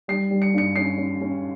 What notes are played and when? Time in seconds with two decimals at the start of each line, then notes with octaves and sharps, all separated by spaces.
0.08 G3 C7
0.31 G3
0.42 C#7
0.54 G2 C#7
0.76 C#4 C7
0.98 C#4
1.21 C#4